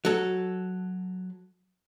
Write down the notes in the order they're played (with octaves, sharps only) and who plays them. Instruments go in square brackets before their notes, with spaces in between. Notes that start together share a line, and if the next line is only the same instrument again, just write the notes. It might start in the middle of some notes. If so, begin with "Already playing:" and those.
[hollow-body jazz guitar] F#3 A4